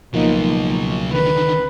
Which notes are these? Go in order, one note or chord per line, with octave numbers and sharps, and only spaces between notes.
C#2 B2 F3 F#3 A#3 D#4
D3 D#3 B4